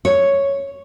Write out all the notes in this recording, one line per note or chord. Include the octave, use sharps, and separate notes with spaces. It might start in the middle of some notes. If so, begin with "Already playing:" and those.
C#5